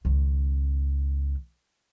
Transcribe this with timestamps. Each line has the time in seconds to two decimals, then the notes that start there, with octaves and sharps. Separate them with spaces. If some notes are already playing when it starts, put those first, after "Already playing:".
0.05 C#2 D#3